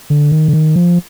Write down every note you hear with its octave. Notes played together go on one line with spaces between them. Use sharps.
D3
D#3
D3
D#3
F3